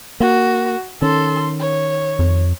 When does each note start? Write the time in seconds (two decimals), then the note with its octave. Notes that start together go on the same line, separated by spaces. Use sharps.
0.20 A#3 F#4
1.02 D#3 C#4 A4 C6
1.60 C#5
2.19 F2